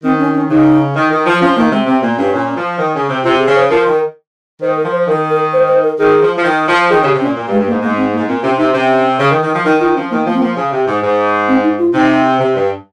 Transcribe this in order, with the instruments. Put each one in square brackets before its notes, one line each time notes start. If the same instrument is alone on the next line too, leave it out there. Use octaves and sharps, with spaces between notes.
[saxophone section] D#3 [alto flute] C4
[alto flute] C#4
C#4
[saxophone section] C#3 [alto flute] D#4
[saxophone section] D#3
D#3
F3
[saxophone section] F3 [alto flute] C#4
[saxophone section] D#3 [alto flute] A#3
[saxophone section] C3 [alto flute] G#3
[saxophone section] C3 [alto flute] C4
[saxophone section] A#2 [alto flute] A#3
[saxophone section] G2 [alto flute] C#4
[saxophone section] A#2
F3
D#3
C#3
C3
[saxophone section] C3 [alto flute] F4
[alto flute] G#4
[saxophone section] C#3
[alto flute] C5
[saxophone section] F3 [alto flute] A#4
[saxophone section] D#3
[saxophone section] D#3 [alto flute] C5
[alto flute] A#4
[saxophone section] F3
[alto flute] C5
[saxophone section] D#3 [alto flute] A#4
[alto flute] A#4
C5
C5
A#4
[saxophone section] D#3 [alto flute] G#4
[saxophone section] F3
F3
D#3
F3
[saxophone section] D#3 [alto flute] G#4
[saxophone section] C#3 [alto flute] G4
[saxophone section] C3
[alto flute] C#4
[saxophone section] A#2
A#2
G2
[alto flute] G#3
[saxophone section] G2
[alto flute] A#3
[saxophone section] G#2
[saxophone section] G#2 [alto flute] A#3
[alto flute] C4
A#3
[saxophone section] G#2
[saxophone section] A#2 [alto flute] C4
[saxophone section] C3 [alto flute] C#4
[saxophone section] C3 [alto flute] D#4
[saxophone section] C3 [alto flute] C#4
[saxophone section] C#3
D#3
D#3
F3
[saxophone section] D#3 [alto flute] D#4
[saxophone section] D#3 [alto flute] F4
[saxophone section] F3 [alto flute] C#4
[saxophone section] D#3 [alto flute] A#3
[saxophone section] F3 [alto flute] A#3
[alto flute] C4
[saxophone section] F3 [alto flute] A#3
[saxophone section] C#3
C3
G#2
G#2
[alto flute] C4
D#4
F4
[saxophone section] C3 [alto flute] D#4
[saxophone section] C3
G2